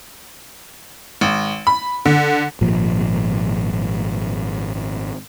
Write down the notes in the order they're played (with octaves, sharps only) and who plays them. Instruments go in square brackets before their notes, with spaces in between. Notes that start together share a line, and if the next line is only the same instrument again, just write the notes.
[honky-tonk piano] G#1
B5
D3
[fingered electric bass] G#1 A#2 F3